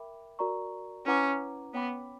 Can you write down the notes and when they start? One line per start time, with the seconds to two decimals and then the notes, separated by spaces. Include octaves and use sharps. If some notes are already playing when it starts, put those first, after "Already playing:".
Already playing: A#4 E5 G5 B5 D6
0.39 F#4 A#4 D5 A#5 C#6
1.06 C#4 E4 B4 F#5 A#5 D6
1.74 B3 C#5 G5 B5 D6